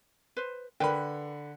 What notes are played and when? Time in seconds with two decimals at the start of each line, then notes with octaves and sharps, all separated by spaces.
0.37 B4 C5
0.80 D3 A#4 B4 G5 B5